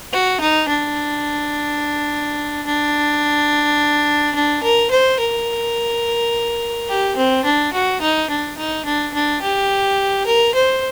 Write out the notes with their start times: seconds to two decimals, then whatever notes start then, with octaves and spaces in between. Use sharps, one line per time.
0.13 F#4
0.41 D#4
0.69 D4
2.67 D4
4.35 D4
4.63 A#4
4.91 C5
5.20 A#4
6.89 G4
7.17 C4
7.45 D4
7.73 F#4
8.01 D#4
8.30 D4
8.57 D#4
8.86 D4
9.14 D4
9.42 G4
10.26 A#4
10.55 C5